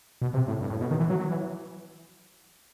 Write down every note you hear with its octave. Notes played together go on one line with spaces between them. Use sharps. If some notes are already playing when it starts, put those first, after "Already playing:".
B2
C3
A2
G2
A2
B2
D#3
E3
F#3
F#3
E3